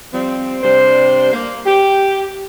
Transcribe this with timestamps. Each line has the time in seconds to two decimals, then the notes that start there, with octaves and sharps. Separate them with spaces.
0.13 F3 G3 C4
0.63 C3 G3 D4 C5
1.33 A#3
1.66 G4